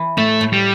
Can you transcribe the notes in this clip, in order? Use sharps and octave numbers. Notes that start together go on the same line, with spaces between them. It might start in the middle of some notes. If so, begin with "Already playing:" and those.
Already playing: E3
A2 A3
A2
G3